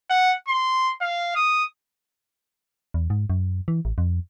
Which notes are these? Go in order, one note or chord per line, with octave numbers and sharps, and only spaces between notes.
F#5
C6
F5
D#6
E2
G#2
F#2
E3
A1
F2